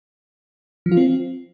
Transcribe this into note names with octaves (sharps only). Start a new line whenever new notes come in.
F3
F4
C4